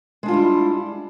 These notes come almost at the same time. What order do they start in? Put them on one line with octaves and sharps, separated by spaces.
G#3 D4 F4 G3 E4